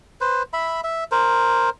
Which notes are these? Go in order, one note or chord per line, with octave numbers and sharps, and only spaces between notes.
B4 C5
E5 B5
E5
A#4 C5